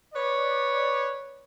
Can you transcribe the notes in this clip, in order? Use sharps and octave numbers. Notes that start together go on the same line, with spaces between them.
B4 C#5 D5